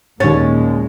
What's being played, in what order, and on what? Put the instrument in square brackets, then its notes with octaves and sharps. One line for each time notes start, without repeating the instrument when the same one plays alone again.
[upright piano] D#2 A6 [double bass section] A#2 G#3 [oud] C#4